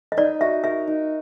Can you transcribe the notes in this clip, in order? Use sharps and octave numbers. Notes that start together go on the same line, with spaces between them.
D#5
D#4 D5
F#4 E5
A#4 E5
D#4